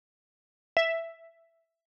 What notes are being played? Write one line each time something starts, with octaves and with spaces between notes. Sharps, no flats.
E5